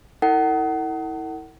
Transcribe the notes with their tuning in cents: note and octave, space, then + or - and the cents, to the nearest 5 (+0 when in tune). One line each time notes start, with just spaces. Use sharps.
E4 -30 A#4 -45 F#5 +30